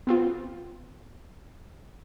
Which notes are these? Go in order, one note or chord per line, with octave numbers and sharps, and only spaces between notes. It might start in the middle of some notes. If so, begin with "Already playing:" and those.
B3 C4 F4